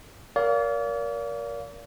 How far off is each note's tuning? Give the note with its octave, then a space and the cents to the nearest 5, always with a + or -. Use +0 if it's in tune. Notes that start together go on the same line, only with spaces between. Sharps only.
A#4 +15 D5 -40 F5 +0